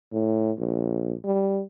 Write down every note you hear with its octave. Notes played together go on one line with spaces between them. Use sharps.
A2
A#1
G3